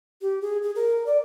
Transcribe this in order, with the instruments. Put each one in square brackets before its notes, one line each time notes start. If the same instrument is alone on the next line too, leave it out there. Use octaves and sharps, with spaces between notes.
[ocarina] G4
G#4
G#4
A#4
D5